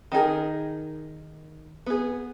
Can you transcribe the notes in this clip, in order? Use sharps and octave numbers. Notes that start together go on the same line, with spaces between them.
D#3 D#4 G#4 A#4
B3 G#4